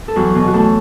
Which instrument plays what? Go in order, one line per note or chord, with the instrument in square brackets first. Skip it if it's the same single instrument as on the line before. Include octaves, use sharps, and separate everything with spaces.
[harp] A4
E2 F#3 F#4
B2
F#4
E2 A3 A4